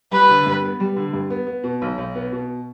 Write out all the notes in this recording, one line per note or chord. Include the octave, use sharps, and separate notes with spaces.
G3 B4
D3
G2
B3
G3
D3
G2
B3
B3
B2
B1
B1
B3
B2